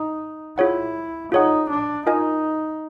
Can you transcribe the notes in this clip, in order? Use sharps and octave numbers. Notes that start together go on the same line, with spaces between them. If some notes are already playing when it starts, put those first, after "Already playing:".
Already playing: D#4
E4 F4 G#4 C#5 F#5
D#4 F4 G#4 C#5 F#5
D4
D#4 F4 A#4 D#5 G#5